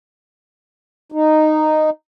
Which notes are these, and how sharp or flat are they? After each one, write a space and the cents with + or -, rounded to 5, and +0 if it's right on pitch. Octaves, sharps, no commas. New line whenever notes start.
D#4 -10